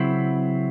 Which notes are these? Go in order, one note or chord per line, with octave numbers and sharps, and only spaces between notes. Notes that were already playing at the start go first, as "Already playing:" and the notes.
Already playing: C#3 F#3 C4 E4